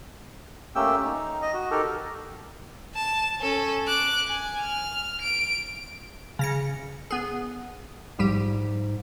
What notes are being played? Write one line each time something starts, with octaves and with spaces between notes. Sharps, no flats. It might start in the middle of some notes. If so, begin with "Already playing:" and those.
A3 A#3 C#4 G4 G5 E6
D#4
D#5
F#4
D#4 G4 A4 A#4
A5
C#4 A4
D6 F#6
G#5
F6
D7
C#3 A#6 C#7
B3 G#4
A#1 G#2 G3 G4